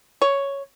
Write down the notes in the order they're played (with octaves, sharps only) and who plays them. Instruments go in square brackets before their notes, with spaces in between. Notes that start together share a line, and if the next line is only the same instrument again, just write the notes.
[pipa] C#5